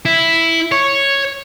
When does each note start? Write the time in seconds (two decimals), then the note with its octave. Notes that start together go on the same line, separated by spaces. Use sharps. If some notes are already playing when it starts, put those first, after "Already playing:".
0.05 E4
0.72 C#5